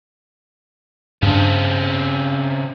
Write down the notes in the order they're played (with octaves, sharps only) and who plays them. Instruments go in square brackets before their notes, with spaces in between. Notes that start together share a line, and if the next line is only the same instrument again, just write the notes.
[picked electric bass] G2 D4 [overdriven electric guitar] C#3 C4